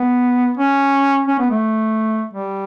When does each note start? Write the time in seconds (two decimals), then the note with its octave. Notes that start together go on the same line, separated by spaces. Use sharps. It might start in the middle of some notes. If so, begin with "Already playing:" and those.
Already playing: B3
0.58 C#4
1.28 C#4
1.39 B3
1.51 A3
2.33 G3